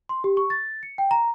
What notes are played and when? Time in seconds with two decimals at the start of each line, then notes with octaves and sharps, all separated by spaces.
0.09 C6
0.24 G4
0.37 C#6
0.50 A6
0.83 C#7
0.98 G5
1.11 A#5